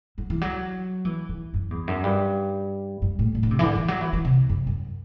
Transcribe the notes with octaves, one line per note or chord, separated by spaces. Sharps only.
F#3
E3
F#3
E3
E3
F#2
E2
F#2
G2
F#2
A2
A2
D3
C3
E3
D3
E3
F#3
E3
E3
C3
F#2
F#2